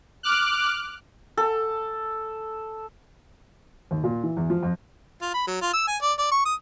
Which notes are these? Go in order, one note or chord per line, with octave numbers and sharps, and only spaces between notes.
D6 F6 F#6
A4
D#2
A#2
E3
E2
F3
F2
F4
B5
F#3
F4
E6
G#5
D5
D5
C#6
D#6